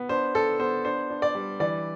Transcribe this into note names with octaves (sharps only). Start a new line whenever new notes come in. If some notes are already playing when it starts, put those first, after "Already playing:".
Already playing: B3
D4 C5
D4 A4
B3 C5
D4 C5
D4
D5
G3
E3 D5